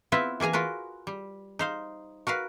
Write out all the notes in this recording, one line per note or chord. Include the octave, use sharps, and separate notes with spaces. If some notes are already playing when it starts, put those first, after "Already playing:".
B3 C4 E4 F4 B4 E5
E3 A#3 G#4 G#5 A#5
F4 F#4 A#4 B4
G3
D#4 C5 F5
F#4 A#4 B4 F5